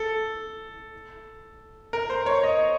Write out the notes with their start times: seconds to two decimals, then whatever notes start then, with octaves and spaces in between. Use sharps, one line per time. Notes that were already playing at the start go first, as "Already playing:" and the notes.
Already playing: A4
1.93 A#4
2.10 C5
2.22 C5
2.26 C#5
2.43 D#5